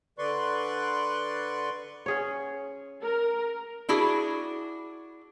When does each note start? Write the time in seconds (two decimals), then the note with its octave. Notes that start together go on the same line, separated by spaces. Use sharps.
0.18 D3 B4 D5 C6 C#6
2.06 C#4 G#4 C#5
3.02 A#4
3.89 D4 E4 F#4 G#4